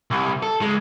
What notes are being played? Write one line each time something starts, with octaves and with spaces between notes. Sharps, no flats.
C2
A4
C#2 G#3